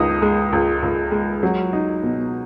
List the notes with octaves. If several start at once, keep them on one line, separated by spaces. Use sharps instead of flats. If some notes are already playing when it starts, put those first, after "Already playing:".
Already playing: C#2 D#4 D#6
G#3
C#2
C#2
G#3
F#3
D#4
B2